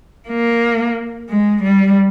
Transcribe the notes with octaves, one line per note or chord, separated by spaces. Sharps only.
A#3
G#3
G3